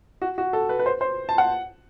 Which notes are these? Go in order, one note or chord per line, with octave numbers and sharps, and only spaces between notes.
F#4
F#4
A4
B4
B4
C5
C5
A5
F#5